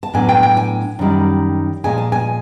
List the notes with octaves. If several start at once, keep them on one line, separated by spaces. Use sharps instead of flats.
A5
A2 F#3 B3 D4 G#5
G5
G5
G#5
F#2 D#3 G3
A#2 F3 G#3 G#5
A5
G#5